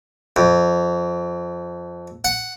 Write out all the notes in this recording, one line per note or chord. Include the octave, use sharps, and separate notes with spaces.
F2
F#5